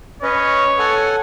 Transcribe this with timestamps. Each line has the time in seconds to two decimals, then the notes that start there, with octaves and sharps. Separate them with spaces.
0.23 C#4 B4 C#5 D#5
0.79 A4 F#5 G#5